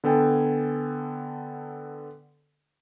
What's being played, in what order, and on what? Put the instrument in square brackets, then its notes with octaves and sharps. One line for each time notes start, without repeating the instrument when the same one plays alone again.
[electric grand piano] D3 B3 A4 G5 G#5